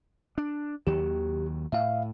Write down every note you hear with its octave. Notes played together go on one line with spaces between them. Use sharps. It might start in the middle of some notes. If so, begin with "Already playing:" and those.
D4
D#2 D#3 F#3 G4
A2 E5 F5